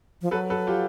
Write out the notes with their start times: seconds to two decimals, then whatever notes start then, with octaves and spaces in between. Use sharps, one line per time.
0.22 F3
0.31 F#3 A4 B4
0.50 A4 B4
0.67 F4 G4